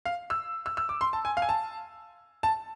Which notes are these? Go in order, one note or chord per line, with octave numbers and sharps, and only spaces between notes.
F5
E6
E6
E6
D6
C6
A5
G#5
F5
G#5
A5
A5